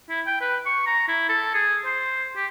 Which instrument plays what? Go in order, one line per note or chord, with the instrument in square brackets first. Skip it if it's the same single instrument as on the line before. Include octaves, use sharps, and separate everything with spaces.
[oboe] E4
G5
B4
C#6
A#5
E4
A4
G#4
C5
G4